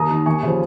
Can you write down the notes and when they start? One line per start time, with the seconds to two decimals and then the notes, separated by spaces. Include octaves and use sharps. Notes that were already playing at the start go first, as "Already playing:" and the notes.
Already playing: D#2 A#5 D#6
0.10 D#3
0.26 D#2 G#5 C#6
0.43 C#3 F3